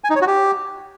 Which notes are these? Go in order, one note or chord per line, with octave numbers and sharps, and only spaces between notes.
G#5
D#4
C#5
F#4
G4